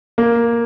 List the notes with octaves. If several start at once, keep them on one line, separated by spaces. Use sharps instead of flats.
A#3